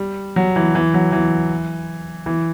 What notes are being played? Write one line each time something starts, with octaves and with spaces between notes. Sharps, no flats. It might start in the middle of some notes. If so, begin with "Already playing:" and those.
Already playing: G3
F#3
E3
E3
F#3
E3
E3